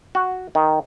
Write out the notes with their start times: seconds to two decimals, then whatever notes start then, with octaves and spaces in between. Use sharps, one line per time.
0.15 F#4
0.55 D#3